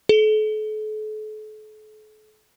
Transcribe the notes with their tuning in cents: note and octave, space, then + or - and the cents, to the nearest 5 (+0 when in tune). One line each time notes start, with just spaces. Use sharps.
A4 -40